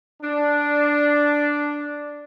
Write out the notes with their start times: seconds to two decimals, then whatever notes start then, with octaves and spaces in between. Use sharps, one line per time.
0.21 D4